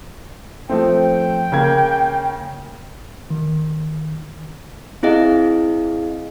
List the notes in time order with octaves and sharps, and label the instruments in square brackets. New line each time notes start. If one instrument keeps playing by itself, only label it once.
[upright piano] F3 A3 C4 [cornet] G5
[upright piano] C#3 A#3 G#6
[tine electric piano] D#3
[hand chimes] C4 E4 G#4 D#5 F5